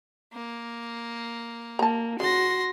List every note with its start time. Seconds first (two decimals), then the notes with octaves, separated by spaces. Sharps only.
0.34 A#3
1.79 A#3 A5 A#5
2.20 C#3 F#4 C6 A#6